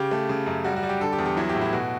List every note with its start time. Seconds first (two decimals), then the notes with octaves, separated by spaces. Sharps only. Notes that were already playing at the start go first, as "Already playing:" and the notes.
Already playing: C#3 G4
0.11 A3
0.29 C#3
0.46 F#2
0.64 G3 F#4
0.76 F#4
0.83 G3
0.89 G4
1.01 D3 A4
1.12 G4
1.18 E2
1.26 G4
1.37 F#3 E4
1.49 G4
1.55 A2
1.61 E4
1.73 B2 F#4